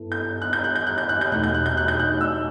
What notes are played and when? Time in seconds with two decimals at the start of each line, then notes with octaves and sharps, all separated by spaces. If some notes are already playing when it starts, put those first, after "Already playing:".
Already playing: G2 B3 E4 A4
0.12 G6
0.42 F#6
0.53 G6
0.64 F#6
0.76 G6
0.87 F#6
0.98 G6
1.09 F#6
1.21 G6
1.31 E2 B2 A3 D#4 F#4 F#6
1.44 G6
1.55 F#6
1.66 G6
1.77 F#6
1.88 G6
2.00 F#6
2.21 E6